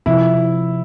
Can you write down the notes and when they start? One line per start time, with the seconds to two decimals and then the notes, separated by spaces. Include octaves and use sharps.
0.06 C3 F3 C4 E4